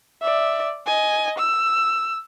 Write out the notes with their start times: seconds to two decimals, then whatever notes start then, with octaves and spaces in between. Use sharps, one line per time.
0.22 D5 E5
0.87 D#5 G#5
1.38 E6